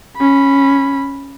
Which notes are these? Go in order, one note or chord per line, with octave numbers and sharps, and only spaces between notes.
C#4 B5